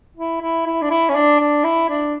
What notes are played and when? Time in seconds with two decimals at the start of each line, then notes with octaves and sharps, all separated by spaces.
0.17 E4
0.42 E4
0.66 E4
0.82 D4
0.90 E4
1.09 C#4
1.15 D4
1.40 D4
1.64 E4
1.89 D4